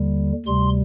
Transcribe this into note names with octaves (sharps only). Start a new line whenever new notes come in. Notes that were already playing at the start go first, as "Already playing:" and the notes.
Already playing: D#2 D3 G3
D2 C3 G3 C6